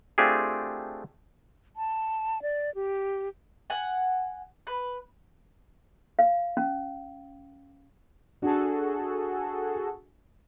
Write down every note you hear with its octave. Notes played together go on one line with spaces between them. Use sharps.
A3 C4 D4 F4 G4 G#4
A5
D5
G4
F#5 G#5
B4
F5
C#4
D4 F#4 G#4 A4